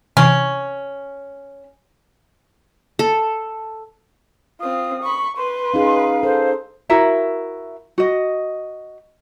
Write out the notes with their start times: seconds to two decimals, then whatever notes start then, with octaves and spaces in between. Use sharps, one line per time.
0.17 C3 E3 C#4
2.99 A4
4.61 C4 F4 D#6
5.03 B5 C#6
5.37 B4 C6
5.74 C#4 D#4 G#4 F5
6.23 A4 C5
6.90 E4 F#4 A#4 E5
7.98 F#4 D#5